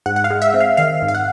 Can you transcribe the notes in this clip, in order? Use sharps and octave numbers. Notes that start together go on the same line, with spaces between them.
G#2 F#5
F#5
F5
G#3
E5
C4
F5
D#3 F5
G#2
F5
F#5